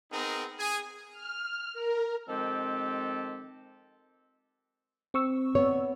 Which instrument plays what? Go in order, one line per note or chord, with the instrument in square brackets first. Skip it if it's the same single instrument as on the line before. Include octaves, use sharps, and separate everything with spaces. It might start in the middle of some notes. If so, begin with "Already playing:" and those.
[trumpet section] B3 C4 D#4 G#4 A#4
G#4 G#5
[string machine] F6
A#4
[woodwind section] D#3 F3 G#3 C4 G4 A4
[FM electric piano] C4 C#6 E6
[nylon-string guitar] B3 C#5